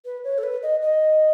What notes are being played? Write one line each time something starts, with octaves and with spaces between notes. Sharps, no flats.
B4
C#5
A4
B4
D#5
D#5